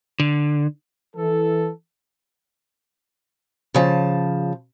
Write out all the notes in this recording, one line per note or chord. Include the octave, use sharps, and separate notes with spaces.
D3
E3 A4
C#3 F3 A5